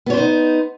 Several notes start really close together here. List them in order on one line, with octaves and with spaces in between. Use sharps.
B3 C#5 C5 D#4